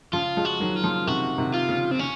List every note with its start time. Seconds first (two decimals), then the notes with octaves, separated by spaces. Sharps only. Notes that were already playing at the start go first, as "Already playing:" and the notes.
0.13 C#3 F3 F4
0.37 F3 G#3
0.45 F#4
0.60 D#3 F#3
0.76 F4
0.84 C#3 F3
1.06 C3 D#3 F#4
1.38 C3 D#3
1.54 F4
1.69 C#3
1.91 C4
1.99 C#3 C#4